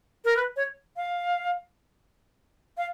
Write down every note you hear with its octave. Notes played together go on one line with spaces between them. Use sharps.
A#4
B4
C#5
F5
F5